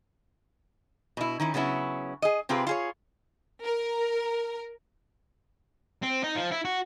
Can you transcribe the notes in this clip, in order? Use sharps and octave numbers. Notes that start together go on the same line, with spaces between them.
B2 E4
D#3 C#4 E4
C#3 F#3 B3 C#4 E4
G#4 D#5
C3 C4 F4 G4 G#4 B4
F4 G#4 C#5
A#4
C4
D#4
F3
E4
F#4